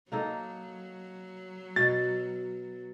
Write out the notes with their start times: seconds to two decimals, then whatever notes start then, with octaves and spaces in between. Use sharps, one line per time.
0.12 F#3 A#3 D#4 A4
1.76 B2 A6